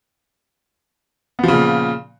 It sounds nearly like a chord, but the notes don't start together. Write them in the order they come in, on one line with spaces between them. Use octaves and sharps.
B3 F3 C#3 A#2